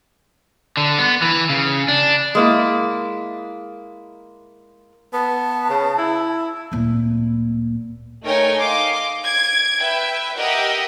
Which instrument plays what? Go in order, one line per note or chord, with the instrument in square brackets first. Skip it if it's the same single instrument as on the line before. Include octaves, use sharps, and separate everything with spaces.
[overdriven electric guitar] D3
B3
E3
C#3
D4
[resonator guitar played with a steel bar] G#3 A#3 E4
[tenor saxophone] B3 [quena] A5
[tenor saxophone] C#3
E4
[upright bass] D1 A#2
[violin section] A3 D#4 A#4 C#5 G5 G#5
D#5 F5 C6 D6
G#6 D7
B4 E5 G5
G4 A#4 D#5 E5 F#5 G5